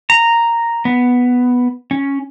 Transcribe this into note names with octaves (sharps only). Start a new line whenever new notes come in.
A#5
B3
C#4